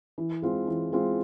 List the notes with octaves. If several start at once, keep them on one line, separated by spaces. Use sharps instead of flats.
E3
G#3 C4 F4
E3
G#3 C4 F4